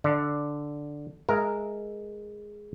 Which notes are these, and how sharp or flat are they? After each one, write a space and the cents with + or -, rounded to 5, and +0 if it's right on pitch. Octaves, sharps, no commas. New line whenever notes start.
D3 +0 D5 -5
G#3 +0 A#4 +0 E5 +0